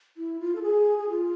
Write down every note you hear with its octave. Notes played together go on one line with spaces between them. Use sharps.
E4
F4
A4
G#4
G#4
F4